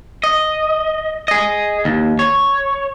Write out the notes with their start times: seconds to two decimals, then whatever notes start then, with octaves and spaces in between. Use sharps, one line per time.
0.24 D#5
1.28 G#4 D#5
1.85 D#2
2.19 C#5